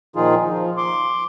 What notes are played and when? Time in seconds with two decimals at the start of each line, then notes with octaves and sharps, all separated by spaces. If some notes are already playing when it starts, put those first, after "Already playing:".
0.16 A#2 D#3 F3 D#4 F4 G#4
0.47 F3
0.77 C6 D6